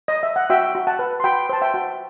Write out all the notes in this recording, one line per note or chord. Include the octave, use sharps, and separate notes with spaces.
D#5
E5
F#5
F#4 E5 G5
F#4
F#5 A5
B4
C6
F#4 G5 B5
C5 A5
E5 G5
F#4